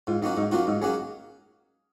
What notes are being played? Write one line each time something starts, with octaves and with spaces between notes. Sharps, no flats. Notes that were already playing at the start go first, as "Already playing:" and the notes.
G#2 F4
F#3 A#3 C#4 D#4 F#4
G#2 D#4
F#3 A#3 C#4 F4 F#4
G#2 D#4
F#3 A#3 C#4 F#4 G#4